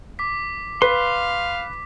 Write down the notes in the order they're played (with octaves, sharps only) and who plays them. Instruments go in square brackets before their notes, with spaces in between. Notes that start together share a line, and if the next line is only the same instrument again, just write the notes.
[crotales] D6 B6
[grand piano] B4 [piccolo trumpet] F5 [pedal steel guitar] C6